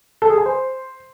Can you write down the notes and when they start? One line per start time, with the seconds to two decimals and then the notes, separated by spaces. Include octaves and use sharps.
0.22 A4
0.30 G#4
0.38 G#5
0.46 C5